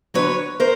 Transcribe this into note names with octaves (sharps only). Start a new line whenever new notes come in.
D#2 D3 F#3 B4 C#5
A#4 C5